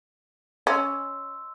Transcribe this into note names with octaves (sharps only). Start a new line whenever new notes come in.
C#4 D#5 C6 E6